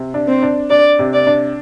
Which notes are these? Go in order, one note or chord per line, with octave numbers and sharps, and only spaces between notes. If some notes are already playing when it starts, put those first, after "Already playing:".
Already playing: C3
D4
C4
D4
D4 D5
C3
D5
D4